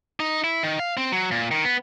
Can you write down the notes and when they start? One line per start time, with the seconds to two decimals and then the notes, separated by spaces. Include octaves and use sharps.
0.20 D#4
0.44 E4
0.63 D#3
0.79 F5
0.97 C4
1.13 F#3
1.31 A#2
1.51 D#3
1.65 B3